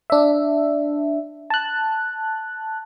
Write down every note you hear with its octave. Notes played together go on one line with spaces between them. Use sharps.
D4 E5
A5 F#6